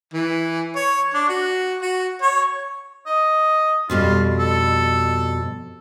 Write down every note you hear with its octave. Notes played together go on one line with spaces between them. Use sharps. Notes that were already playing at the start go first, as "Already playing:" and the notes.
E3
C#5
D4
F#4
F#4
C#5
D#5
F2 B2 G3 F4
A4